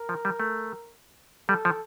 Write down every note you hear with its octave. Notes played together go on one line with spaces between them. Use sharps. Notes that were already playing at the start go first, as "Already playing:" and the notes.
Already playing: A#4
F3
G3
A3
G3 A4
F3